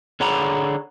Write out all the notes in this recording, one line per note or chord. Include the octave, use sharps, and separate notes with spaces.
D3 G#4 C#5 F#5 A#5 B5